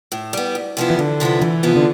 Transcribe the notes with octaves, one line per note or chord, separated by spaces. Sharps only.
A2
G3 B3
D2
C3 F3 B3 E4
E3
D2 D3
C3 F3 B3 E4
D2 E3
C3 F3 B3 E4
D3